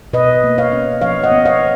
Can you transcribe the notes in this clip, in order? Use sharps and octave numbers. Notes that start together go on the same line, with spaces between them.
B2 B4 D#5
A#3
C#5 F5
C#4
F3 C#5 F5
D#5 F#5
B3
C#5 F5